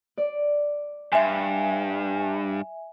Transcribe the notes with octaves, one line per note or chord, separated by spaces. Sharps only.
D5
G2 E5 G#5